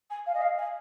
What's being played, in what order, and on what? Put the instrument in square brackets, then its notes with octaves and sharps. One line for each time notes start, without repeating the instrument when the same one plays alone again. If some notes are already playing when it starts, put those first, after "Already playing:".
[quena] G#5
F5
D#5
F5
G#5